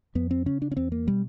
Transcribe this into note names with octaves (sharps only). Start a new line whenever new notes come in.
F2 B3
C4
C#3 C#4
D4
C#4
E2 C4
A#3
B2 G3